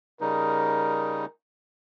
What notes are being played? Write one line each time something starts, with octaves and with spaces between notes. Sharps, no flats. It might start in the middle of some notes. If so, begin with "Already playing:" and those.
C#3 G3 D#4 A#4